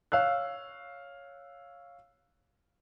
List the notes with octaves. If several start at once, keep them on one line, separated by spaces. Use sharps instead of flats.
C#5 F5 E6 F#6